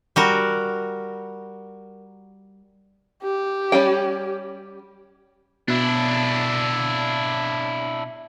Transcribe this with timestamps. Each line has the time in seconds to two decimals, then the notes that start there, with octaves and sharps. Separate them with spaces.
0.16 G3 F#4 A#4
3.23 G4
3.72 G3 C#4 G5
5.68 B2 D4 E4